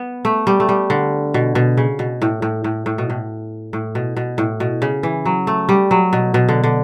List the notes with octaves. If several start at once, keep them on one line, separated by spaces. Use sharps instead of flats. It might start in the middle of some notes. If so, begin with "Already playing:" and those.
Already playing: B3
A3
G3
A3
G3
D3
B2
B2
C#3
B2
A2
A2
A2
A2
B2
A2
A2
B2
B2
A2
B2
C#3
E3
F#3
A3
G3
F#3
B2
B2
D3
D3